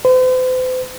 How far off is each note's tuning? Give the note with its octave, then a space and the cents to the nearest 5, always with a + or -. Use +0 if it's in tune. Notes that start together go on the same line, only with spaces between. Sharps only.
C5 -45